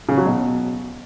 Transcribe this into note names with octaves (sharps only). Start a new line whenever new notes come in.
C#3
F#3
B2